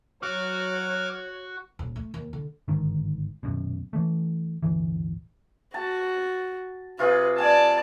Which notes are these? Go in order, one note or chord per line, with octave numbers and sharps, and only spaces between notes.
F#3 F#4 C#5 D6 F6
D#1
A3
D#2
D3
G1 G#2 D#3
D#1 F#2 B2
E3 A3
D1 G1 E3
F#4 A5
C3 F4 G#4 B4
D5 G#5 A5